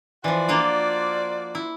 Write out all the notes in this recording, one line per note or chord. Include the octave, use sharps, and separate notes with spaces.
E3 F3 F#4 C5 D5
A#3 D4 F4
E4